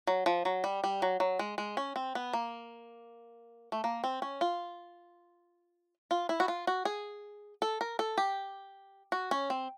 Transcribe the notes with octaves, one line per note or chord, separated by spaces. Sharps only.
F#3
F3
F#3
G3
G3
F#3
F#3
G#3
G#3
C#4
C4
B3
A#3
A3
A#3
C4
C#4
F4
F4
E4
F#4
F4
F#4
G#4
A4
A#4
A4
G4
F#4
C#4
C4